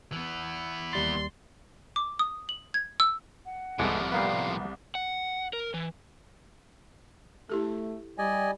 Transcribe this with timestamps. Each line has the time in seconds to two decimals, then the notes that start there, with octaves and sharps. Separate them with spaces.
0.12 E3 B3
0.93 D#2 G3 C6 A6
1.96 D6
2.19 D#6
2.49 F#7
2.74 G#6
3.00 E6
3.46 F#5
3.79 C2 A2 F3 G#3 A3 B3
4.12 G3 A#3 B3 F5
4.95 F#5
5.53 A#4
5.74 E3
7.50 A3 E4 G4 A4
8.18 G3 D5 D#5 G#5